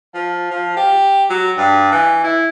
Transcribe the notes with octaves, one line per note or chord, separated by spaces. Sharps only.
F3
F3
G4
F#3
G2
E3
E4